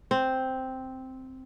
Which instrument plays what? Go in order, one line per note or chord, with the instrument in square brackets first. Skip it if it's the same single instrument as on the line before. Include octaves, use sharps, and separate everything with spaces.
[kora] C4